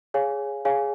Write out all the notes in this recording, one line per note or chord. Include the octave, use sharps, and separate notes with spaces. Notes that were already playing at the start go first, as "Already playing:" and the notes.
G#4 C#5 F5 G#5
G#4 C#5 F5 G#5